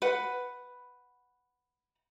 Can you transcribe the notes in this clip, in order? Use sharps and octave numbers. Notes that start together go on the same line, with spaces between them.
B4 F#5